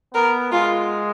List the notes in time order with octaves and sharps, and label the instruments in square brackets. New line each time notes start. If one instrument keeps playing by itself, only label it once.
[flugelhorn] B3 [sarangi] A#4
[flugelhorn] G#3 [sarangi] F4